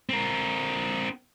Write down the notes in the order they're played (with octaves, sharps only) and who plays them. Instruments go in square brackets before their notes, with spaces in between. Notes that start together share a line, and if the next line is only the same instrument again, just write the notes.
[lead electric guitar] C4 A#4